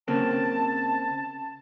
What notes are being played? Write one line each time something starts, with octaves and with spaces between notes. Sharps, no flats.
C#3 A#3 C4 A5